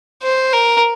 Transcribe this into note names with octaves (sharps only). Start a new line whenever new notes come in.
C5
A#4